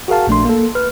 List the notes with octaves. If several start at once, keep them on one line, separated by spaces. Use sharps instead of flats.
F#4 G#4 A#4 F5 A5
A#1 A3 D4 C6
A#3 A4
B4 F6